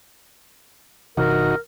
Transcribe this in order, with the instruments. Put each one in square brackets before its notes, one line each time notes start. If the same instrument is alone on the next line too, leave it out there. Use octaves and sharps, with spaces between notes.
[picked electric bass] G1 C3 E3 [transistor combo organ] D#4 F#4 [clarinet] A#4